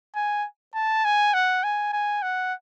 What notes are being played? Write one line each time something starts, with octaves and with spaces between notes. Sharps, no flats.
G#5
A5
G#5
F#5
G#5
G#5
F#5